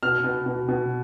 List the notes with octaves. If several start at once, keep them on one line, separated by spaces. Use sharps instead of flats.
B2 F6
B2
B2
B2